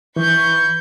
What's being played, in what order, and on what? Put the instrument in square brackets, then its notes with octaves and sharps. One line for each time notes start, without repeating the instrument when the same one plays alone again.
[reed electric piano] E3 [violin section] B4 C#6 G6